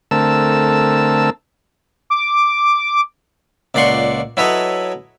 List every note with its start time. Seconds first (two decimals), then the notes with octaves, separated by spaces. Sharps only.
0.11 D3 A3 C4 A#4 A5 E6
2.10 D6
3.75 C#2 A#2 D5 F#5 C6 C#6
4.37 F#3 E4 A4 B4 C#5 D#5